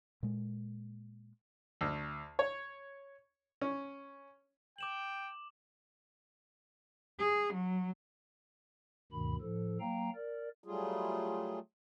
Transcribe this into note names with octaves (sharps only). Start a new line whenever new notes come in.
A#2 G#3
D2
C#5
C#4
G5 D6 E7 F#7
G#4
F#3
D2 G2 B2 D#3 B5
A2 F3 A4
F#3 A#3 F5 G5 A#5
A#4 D5
F#3 G3 A3 F4 G#4